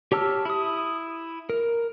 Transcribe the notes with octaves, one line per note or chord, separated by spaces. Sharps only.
G4 C#5 A5 E6 F6
E4 D#6
A#4